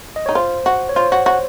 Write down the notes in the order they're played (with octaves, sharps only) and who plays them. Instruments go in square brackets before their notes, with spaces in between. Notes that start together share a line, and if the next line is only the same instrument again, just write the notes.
[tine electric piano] D#5
[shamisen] D#4 [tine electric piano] C#5
[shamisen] F4 [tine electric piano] C5
[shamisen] F#4
[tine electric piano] C#5
[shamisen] F4 [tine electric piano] C5
[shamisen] F#4
F#4